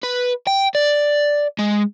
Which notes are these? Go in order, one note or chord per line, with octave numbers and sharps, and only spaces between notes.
B4
G5
D5
G#3